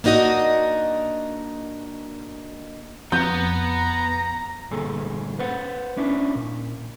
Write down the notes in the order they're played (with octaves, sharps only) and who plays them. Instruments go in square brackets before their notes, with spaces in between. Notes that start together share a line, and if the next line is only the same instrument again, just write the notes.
[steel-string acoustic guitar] A#3 D4 D#4 F#4 D#5
[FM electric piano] F2 [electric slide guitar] B3 [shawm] A#5 [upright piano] G6
[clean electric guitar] D2 G2 A#2 G#4 A4
B4 C5 F#5
C#4 D4 E4
A#2